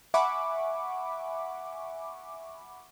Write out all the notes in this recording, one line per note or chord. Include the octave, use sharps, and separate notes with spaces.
E5 F#5 G#5 B5 C#6 D6